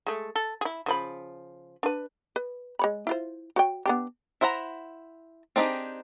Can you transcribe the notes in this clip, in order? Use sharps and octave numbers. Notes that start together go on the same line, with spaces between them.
G#3 A3
A4
E4 G#4
C#3 F3 B5
D4 B4
B4
G#3 C#5 B5
E4 F4 C5
F#4 C#5 G5
B3 D4 G4
E4 C5 E5 F#5 A#5
C4 D4 D#4 G4 G#4